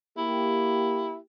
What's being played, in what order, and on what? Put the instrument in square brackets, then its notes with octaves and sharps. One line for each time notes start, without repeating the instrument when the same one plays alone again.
[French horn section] A#3 G4 [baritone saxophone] E4